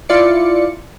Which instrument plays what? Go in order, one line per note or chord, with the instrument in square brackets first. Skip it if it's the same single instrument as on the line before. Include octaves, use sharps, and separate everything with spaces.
[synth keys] E4 F4 D5 C#7